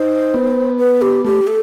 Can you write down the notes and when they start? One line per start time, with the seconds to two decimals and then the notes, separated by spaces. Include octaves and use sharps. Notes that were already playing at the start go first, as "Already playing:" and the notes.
Already playing: D#4 C5
0.34 B3
0.79 B4
1.02 G4
1.25 A3 G4
1.47 A4